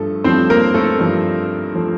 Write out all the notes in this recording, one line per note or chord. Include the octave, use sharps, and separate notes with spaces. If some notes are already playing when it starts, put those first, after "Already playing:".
Already playing: G2 F3 A3 A4
G2 F3 A3 C4 C5
A#3 A#4
A3 A4
G2 F3 A3
F3 A3